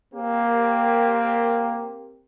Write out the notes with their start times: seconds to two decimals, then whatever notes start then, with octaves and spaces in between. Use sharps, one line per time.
0.14 A#3 C4 G4 A#4